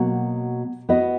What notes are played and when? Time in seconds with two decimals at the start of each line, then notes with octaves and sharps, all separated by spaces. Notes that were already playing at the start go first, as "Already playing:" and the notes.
Already playing: B2 F#3 A#3
0.89 B3 F#4 B4 D#5